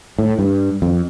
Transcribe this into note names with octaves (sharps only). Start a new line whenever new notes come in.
A2
G2
F2